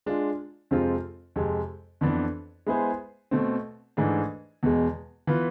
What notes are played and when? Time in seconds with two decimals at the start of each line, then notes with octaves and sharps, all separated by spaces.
0.06 G#3 D4 F4
0.71 F2 C3 G#3 C4 F4
1.36 F2 C3 G#3
2.01 F2 E3 B3 D4
2.66 G#3 B3 E4 G#4 C5
3.31 B2 A3 C4
3.97 G#2 E3 A3 D4 G#4
4.63 E2 B2 G#3
5.27 E3 B3 F4 B4